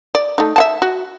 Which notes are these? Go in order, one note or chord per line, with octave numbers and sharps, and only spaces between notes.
D5
A3 D#4
E5 F#5 A5
F#4